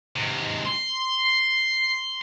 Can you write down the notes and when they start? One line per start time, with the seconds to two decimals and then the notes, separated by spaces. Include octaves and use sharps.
0.16 G#2 C3
0.65 C6